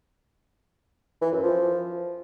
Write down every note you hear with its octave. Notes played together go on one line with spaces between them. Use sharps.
E3
F#2
F3